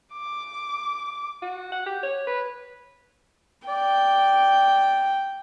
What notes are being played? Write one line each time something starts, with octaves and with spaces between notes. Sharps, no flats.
D6
F#4
F#5
G4
C#5
B4
D5 G5